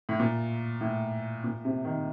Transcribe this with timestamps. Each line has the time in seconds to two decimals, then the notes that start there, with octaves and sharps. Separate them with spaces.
0.09 A2
0.20 A#2
0.81 A2
1.44 A#2
1.65 C3
1.85 D#3